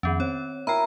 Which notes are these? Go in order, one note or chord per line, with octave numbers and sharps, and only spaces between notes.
F2 D#3 B3 C#4
C4 C#5
E4 A#4 G5 A#5